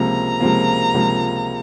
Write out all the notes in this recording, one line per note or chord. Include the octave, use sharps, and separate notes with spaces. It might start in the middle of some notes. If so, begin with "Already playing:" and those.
Already playing: C#2 C3 F3 A#3 A#5
C#2 C3 F3 A#3
C#2 C3 F3 A#3